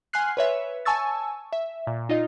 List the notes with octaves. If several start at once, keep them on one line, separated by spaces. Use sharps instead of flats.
F#5 G#5 C6 F6 F#6 C7
B4 C#5 E5
G#5 A5 C#6 E6 A6
E5
A#2
D#4 F4 D#5